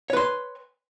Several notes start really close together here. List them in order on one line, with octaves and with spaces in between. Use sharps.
C#5 B4 C6